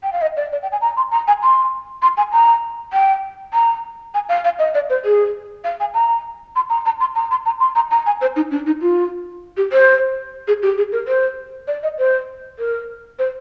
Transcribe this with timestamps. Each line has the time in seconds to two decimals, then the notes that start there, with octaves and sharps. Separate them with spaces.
0.03 G5
0.13 F5
0.22 D#5
0.37 D5
0.52 D5
0.63 G5
0.72 G#5
0.81 A#5
0.97 C6
1.12 A#5
1.28 G#5
1.43 C6
2.02 C6
2.17 G#5
2.33 A#5
2.93 G5
3.54 A#5
4.14 G#5
4.29 F5
4.44 F5
4.59 D#5
4.75 D5
4.90 C5
5.05 G#4
5.64 F5
5.80 G#5
5.94 A#5
6.56 C6
6.70 A#5
6.86 A#5
7.00 C6
7.15 A#5
7.31 C6
7.46 A#5
7.60 C6
7.76 A#5
7.91 A#5
8.06 G#5
8.21 C5
8.36 D#4
8.51 D4
8.66 D#4
8.81 F4
9.57 G4
9.73 C5
10.48 G#4
10.62 G4
10.78 G#4
10.92 A#4
11.08 C5
11.68 D5
11.83 D#5
11.98 C5
12.59 A#4
13.19 C5